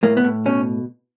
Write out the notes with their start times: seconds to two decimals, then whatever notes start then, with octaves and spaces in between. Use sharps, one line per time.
0.03 A2 A#3
0.17 B3
0.24 A2
0.46 B2 C#4